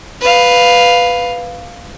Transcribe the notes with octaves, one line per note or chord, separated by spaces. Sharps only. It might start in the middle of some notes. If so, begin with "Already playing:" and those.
B4 F5